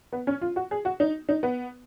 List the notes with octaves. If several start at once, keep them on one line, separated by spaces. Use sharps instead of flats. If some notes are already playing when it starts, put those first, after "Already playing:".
B3
C#4
F4
F#4
G#4
F#4
D#4
D#4
B3